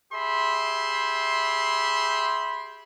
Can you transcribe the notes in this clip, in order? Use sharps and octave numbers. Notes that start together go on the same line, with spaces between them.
G4 G#4 E5 B5 C6